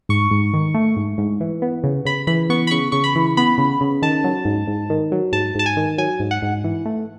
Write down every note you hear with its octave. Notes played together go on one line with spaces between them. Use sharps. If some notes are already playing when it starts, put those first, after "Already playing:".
G#2 C#6
G#2
D#3
A3
G#2
G#2
E3
B3
C#3
C#3 B5
E3 B5
B3 C#6
B5
C#3 C#6
C#3 C#6
B5
E3
B3 B5
C#3
C#3
D#3 A5
F#3
G#2
G#2
D#3
F#3
G#2 A5
G#2 A5
G#5
D#3
F#3 G#5
G#2
F#5
G#2
E3
A3